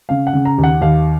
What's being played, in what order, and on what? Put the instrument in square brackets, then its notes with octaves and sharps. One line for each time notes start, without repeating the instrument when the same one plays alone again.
[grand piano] C#3 F5
F#5
C#3
A#5
D#2
F#5
D#2 F5